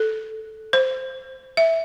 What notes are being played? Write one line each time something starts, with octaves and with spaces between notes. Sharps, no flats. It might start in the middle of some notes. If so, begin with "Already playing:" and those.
Already playing: A4
C5
E5